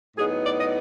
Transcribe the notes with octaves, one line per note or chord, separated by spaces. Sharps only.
A2 F#3 B3 D#4 G#4
D5
D#5